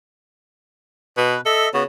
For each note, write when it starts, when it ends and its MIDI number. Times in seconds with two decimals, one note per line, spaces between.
1.17 1.36 47
1.17 1.41 71
1.46 1.67 69
1.46 1.69 75
1.46 1.69 76
1.74 1.85 49
1.74 1.84 59
1.74 1.84 66